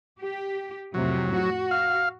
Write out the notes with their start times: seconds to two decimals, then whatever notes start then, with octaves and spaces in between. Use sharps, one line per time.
0.19 G4
0.94 F2 A2 C3 F#3
1.35 F#4
1.71 F5